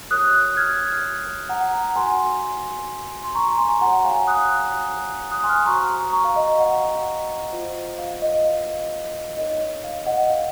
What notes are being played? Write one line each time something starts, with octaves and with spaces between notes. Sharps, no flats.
F#4 A#4 C#5 D#6 F#6
F6 G#6
F#5 A#5
F#5 A#5
D#4 F#4 A#4 G#5 C6
C6
A#5 C#6
G#5 C6
F#4 A#4 C#5 F#5 A#5
F5 G#5
D#6 F#6
D#6 F#6
G#5 C6
F6
C6 D#6
F#4 C5 A#5 C#6
A#5 C#6
F5
D#5
D#5 F#5
F4 C5
F5
D#5
F5
D#4 A#4 C#5 D#5
F5
D#5 F#5
F5